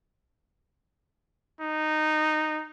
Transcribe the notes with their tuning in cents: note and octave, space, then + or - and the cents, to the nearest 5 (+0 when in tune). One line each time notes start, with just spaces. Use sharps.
D#4 -10